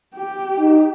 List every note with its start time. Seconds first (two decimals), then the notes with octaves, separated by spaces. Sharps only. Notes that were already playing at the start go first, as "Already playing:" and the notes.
0.15 G4
0.57 D#4